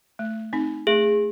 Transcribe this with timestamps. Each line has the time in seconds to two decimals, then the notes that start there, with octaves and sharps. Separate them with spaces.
0.19 A3
0.53 C4 D#4
0.87 A3 G#4